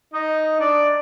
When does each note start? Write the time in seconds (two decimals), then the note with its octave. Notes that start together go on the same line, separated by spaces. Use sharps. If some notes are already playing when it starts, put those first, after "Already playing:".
0.13 D#4 D#5
0.60 D4 D5